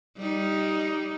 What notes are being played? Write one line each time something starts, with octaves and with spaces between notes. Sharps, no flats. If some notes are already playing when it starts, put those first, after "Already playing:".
G3 D#4